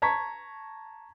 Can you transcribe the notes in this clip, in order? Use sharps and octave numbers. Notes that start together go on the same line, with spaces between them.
A5 A#5 C#6 G#6 B6